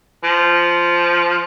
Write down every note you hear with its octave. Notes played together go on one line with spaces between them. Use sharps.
F3